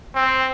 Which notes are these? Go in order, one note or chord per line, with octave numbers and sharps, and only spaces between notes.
C4